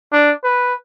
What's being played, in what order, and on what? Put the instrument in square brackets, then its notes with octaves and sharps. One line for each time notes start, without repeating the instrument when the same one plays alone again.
[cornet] D4
B4